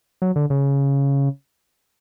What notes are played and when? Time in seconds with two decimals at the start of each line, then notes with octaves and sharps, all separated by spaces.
0.22 F#3
0.36 D3
0.50 C#3